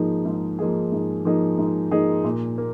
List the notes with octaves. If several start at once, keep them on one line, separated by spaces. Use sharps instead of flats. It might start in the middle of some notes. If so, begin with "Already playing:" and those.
Already playing: G#2 F3 A#3 D#4 G#4
G#2
F3 A#3 D#4 G#4
G#2
F3 A#3 D#4 G#4
G#2
F3 A#3 D#4 G#4
A#2
A#3